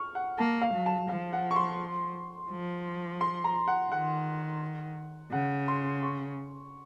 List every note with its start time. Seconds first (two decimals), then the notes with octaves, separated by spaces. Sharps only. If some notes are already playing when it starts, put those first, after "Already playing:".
Already playing: C#6 F6
0.15 F#5
0.38 A#3 A5
0.62 F5
0.74 F#3
0.86 A5
1.09 F3 F5
1.33 F#5
1.51 C#6
1.56 C6
2.51 F3
3.21 C6
3.44 A#5
3.68 F#5
3.91 D#3 F#5
5.32 C#3 F#5
5.68 C6
6.03 C#6